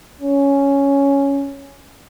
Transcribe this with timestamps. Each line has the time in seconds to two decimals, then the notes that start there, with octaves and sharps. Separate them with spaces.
0.21 C#4